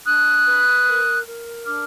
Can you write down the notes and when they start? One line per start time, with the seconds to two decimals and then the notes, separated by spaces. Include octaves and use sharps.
0.04 D4 D#6 F#6
0.45 B4
0.86 A#4
1.25 A#4
1.65 D4 D6 F6